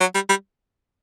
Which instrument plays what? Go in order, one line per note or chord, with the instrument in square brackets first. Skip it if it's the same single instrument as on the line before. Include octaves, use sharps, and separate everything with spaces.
[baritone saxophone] F#3
G3
G3